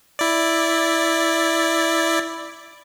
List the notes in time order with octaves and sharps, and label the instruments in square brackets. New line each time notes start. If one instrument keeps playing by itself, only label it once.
[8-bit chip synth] E4 D5